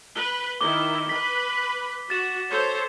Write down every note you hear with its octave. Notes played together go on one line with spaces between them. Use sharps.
B4 G7
D#3 E4 D6 G7
B4 B5 B6
F#4 A6 E7
A4 C5 C#5